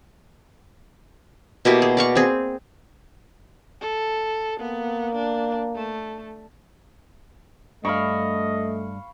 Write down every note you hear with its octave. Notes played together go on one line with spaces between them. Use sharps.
B2 A#3 E4 G4
G#4
D5 F5 C#6
C4 G#4
A4
A#3 B3
D4
A3
G2 A3 D4 D#5 F5 B5 C#6